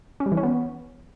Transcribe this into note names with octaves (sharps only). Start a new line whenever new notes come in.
C#4
G3
E3
C#4
B3